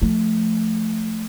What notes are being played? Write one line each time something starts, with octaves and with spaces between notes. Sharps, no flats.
F3 A3